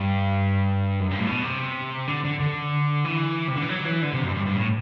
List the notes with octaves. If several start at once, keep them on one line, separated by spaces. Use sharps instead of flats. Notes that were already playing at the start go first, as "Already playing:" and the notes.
Already playing: G2
F#2
G2
A2
B2
C3
D3
D3
D3
E3
C3
D3
E3
F#3
E3
D3
C3
F#2
G2
G2
A2